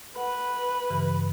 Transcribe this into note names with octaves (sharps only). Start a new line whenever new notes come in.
B4 F#5
G2 C#3 E3